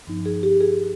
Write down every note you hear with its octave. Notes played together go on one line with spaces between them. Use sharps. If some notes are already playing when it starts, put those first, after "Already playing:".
G2 F3 B3 D#4
G#4
G4
G#4